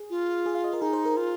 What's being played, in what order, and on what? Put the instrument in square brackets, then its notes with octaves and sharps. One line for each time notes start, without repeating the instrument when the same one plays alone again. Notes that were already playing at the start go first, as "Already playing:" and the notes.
Already playing: [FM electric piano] G#4
[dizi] F4
[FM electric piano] G#4
F5
D#5
A#4
[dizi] D#4 [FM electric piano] G#4
[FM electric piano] C5
A#4
[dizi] F4